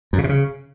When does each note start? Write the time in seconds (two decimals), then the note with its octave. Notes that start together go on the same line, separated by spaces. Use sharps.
0.13 F#2
0.18 C#3
0.24 C3
0.29 C#3